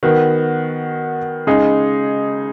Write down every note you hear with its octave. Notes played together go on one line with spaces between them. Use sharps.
D#3 B3 F#4
C#3 G#3 D#4 G#4